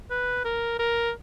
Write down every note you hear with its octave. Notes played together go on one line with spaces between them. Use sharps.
B4
A#4
A#4